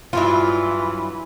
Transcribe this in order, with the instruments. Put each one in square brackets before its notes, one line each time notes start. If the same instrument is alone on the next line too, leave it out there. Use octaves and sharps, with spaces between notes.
[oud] G2 F#3 E4 [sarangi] E3 [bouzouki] F4